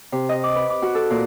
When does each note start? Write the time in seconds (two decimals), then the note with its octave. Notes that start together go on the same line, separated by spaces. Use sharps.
0.12 C3
0.29 D#5
0.43 D6
0.55 B4
0.70 D6
0.82 F#4
0.95 A4
1.10 A#2